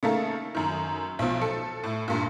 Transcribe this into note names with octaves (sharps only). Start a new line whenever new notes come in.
C#3 A3 A#3 D#4 A4
F#2 D#3
B1 F3
A4
A2
G2 A#2